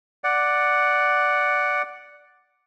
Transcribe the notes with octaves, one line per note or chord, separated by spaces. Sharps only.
D5 F#5